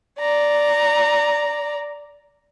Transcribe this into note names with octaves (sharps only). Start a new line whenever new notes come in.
D5 A#5